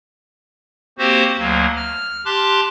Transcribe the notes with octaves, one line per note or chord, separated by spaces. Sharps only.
A#3 C4 F#4 G4 C5
D2 F#3 A#3
F6
G4 A5 C6 D6 F#6